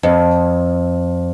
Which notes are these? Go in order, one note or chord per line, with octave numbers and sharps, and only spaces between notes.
F2